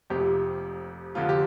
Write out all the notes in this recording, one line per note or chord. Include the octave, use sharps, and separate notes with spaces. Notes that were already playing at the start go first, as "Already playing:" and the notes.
F1 F2 C3 G4
F1 F2 D3 F4
G4